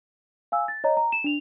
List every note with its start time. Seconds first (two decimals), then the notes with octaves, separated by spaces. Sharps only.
0.52 F5 G#5 E6
0.68 A6
0.84 C#5 D#5 A#5
0.97 A#5
1.12 E7
1.24 D4 F7